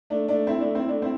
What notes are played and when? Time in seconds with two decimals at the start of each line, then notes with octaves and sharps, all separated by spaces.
0.10 A3 D4
0.28 A3 D4
0.47 C4 E4
0.60 A3 D4
0.75 C4 E4
0.88 A3 D4
1.02 C4 E4